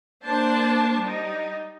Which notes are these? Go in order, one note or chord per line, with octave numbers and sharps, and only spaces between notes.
A#3 D4 C5 A5
G3 D#4